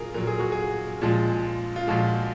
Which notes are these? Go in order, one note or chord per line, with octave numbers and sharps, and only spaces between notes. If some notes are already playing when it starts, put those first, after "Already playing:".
Already playing: A#2 F#3 F4 G#4 A#4
A#2 F#3 A#4
G#4
F#4
G#4
A#2 F3 G#3
F4
A#2 F3 G#3 F#4